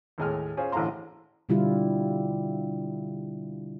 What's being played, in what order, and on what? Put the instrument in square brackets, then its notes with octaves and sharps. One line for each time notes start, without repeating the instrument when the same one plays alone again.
[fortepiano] D#2 A2 G#3 A3 G#5 F6
C#4 F4 G#4 C5
A1 A2 D3 F5 A#5 C6
[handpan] B2 D3 G3 E4 F4